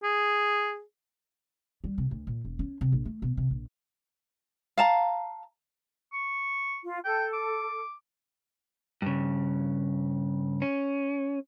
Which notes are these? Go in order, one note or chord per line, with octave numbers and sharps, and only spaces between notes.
G#4
G3
C3
D2
A#2
E1
C#4
C3
A#1
A3
B2
C3
A#1
F5 A5 A#5
C#6
F4
A4 G5
D6
G2 C#3
C#4